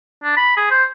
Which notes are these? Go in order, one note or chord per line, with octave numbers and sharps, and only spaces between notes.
D4
B5
G#4
C5